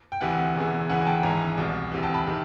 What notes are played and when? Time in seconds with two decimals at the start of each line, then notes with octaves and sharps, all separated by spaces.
0.12 G5
0.21 D2 C3 E3 F#5 G#5
0.56 E1 E2 C#3 E3
0.89 D2 C#3 E3 F#5 G#5
1.01 G#5
1.06 G5 A5
1.23 G#1 G#2 E3 G#5 A#5
1.58 C2 B2
1.92 D2 C3 E3
2.03 G5 A5
2.14 A5 B5
2.27 C3 D#3